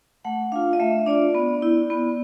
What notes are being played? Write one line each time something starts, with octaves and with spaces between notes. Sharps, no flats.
A3 F#5
D4 F4 F5
D#5
A3 E5
D4 F4 D5
B3
E4
B3